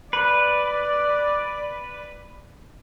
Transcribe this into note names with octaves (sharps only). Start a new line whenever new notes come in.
B4 D5